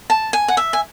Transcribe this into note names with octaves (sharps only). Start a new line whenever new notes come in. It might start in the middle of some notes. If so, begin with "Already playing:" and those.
A5
G#5
F#5
E5
G#5